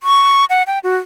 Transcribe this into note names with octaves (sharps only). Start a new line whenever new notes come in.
C#6
F#5
G5
F#4